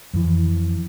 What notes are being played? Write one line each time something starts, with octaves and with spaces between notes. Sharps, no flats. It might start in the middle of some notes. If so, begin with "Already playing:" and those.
F2 E3